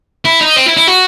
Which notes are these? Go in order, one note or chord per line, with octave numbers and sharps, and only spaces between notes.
E4
D#4
C4
E4
E4
F#4